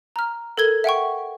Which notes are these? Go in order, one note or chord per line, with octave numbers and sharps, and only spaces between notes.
A#5 F6
A4 A#4 G#6 G7
E5 F#5 G5 C#6